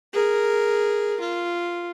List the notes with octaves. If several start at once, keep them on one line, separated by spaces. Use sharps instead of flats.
G#4 A#4
F4